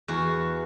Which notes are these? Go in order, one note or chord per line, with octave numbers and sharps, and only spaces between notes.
E2 F#4